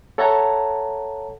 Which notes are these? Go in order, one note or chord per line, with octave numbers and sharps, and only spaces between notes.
A4 C#5 E5 F#5 A5 A#5